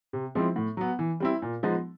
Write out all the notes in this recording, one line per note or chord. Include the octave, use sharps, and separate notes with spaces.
C3
F3 G#3 C4 E4
A2
F#3 B3
E3
G3 C4 E4
A#2
F3 G#3 B3 D#4